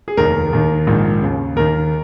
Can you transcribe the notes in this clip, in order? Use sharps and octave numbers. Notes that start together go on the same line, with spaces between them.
G#4
F1 D#2 D#3 A#4
D#2 D#3
A#1 G#2 D#3
D#2 C#3
D#2 D#3 A#4